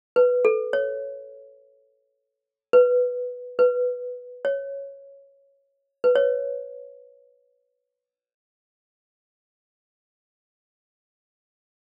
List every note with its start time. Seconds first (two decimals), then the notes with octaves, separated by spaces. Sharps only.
0.16 B4
0.45 A4
0.73 C#5
2.73 B4
3.59 B4
4.45 C#5
6.04 B4
6.15 C#5